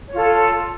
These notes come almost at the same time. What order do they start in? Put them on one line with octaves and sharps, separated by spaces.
C#5 F4 A4